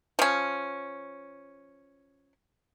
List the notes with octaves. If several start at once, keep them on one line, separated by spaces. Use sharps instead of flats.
F3 C#4